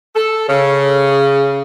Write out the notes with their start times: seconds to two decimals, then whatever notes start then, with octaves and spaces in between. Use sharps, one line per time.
0.16 A4
0.49 C#3